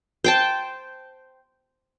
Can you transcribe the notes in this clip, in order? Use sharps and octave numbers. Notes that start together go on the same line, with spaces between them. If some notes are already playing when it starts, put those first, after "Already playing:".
C5 G5 A5